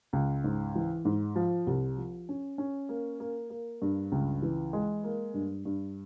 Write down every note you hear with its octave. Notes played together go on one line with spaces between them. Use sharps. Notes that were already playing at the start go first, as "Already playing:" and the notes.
C#2
G#2
E3
G#2
F3
C2
F3
C#4
C#4
A#3
A#3
A#3
G2
C#2
E3
G#3
A#3
G2
G2